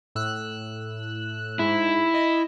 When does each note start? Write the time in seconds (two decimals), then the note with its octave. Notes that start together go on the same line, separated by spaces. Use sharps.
0.15 A2 E6 F#6
1.59 G#2 E4
2.14 D#5